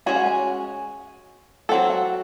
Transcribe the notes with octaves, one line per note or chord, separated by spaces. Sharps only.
G#3 C#4 F#4 C#5 G#5
F#5
G#5
F#3 C4 F#4 A4 F#5
F#5